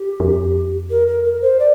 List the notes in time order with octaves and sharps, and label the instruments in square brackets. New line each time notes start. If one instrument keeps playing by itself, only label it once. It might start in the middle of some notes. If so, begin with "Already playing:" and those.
Already playing: [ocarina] G4
[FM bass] F2
[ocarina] A#4
A#4
A#4
C5
D5